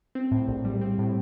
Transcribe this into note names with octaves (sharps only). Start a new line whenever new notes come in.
C4
A2
A#1
G3
C4
A2